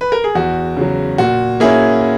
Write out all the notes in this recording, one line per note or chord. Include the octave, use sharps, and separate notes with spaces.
B4
A#4
G#4
E2 F#4
C#3 F#3
A#2 F#4
A#3 C#4 E4 G#4